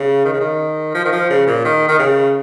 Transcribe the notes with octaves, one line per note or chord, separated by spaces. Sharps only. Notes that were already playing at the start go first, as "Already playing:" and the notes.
Already playing: C#3
D#3
C#3
D#3
F3
D#3
F3
C#3
A#2
D#3
D#3
C#3